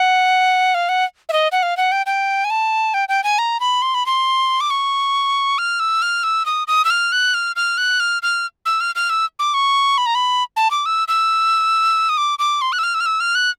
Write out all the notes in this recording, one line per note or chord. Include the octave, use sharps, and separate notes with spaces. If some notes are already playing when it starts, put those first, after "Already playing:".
Already playing: F#5
F5
F#5
E5
D#5
F#5
F5
F#5
G5
G5
G#5
A5
G5
G5
G#5
A#5
B5
C6
B5
C6
D6
C#6
F6
E6
F6
E6
D#6
D#6
E6
F6
F#6
F6
F6
F#6
F6
F6
E6
F6
F6
E6
D6
C#6
B5
A#5
B5
A5
D6
E6
E6
D#6
D6
D6
C6
F#6
E6
F6
E6
F6
E6
F6
F#6